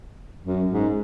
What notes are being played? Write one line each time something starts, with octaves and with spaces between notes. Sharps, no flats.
F#2
G#2